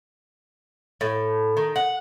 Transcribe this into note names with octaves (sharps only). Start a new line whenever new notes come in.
A2
D#3
F#5